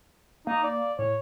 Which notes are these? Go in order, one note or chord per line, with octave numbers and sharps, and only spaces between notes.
A#3 D#4
D5
A2 C#5